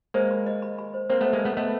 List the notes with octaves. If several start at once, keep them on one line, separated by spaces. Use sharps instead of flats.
G#3 A#3 C5
B5
D#5
B5
B5
C5
A#3 C4 C5
A3 B3 C5
G#3 A#3
A3 B3 D#5
A3 B3 D#5